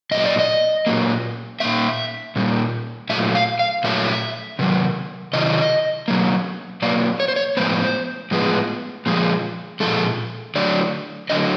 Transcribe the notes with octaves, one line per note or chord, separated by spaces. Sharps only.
A#2 F#3 A#3 D#5
D5
D#5
A#2 F#3 A#3
A#2 G3 A#3 E5
A#2 G3 A#3
A#2 F#3 A3 E5
F5
F5
A#2 F#3 A3 E5
C3 D#3 F#3
C3 D#3 F#3 D#5
B2 F#3 A#3
B2 F#3 A#3 D5
C#5
C5
C#5
A2 F3 G#3 B3 C5
A2 F3 G#3 B3
A#2 F3 G#3
A#2 F3 G#3 A4
D3 F#3 A3 D5
D3 F#3 A3 D#5